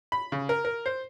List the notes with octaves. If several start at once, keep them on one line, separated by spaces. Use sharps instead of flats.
B5
C#3
A#4
A#4
C5